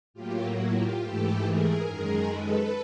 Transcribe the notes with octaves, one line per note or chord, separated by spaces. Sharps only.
A2 F#3 A#3 F4 G4
E4 F#4
F4 G4
G#2 E3 A3 G4 A4
G#4 A#4
F#2 D#3 G#3 G#4 A#4
A4 B4